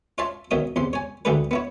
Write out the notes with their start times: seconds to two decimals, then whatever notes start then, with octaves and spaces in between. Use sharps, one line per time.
0.18 F4 C#5 E5 A5 C6
0.51 B1 D#3 C#5 E5 D#6
0.76 E2 C3 C6
0.93 C#5 G#5
1.25 D2 D3 A3 G4 G#4 B4
1.51 B3 E4 C#5